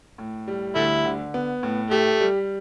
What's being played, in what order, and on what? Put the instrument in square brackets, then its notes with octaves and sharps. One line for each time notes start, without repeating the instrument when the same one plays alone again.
[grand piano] A2
G3
[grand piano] D2 [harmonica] A3 E4
[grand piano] D3
B3
A2
[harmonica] A3 [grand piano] G4
[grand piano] G3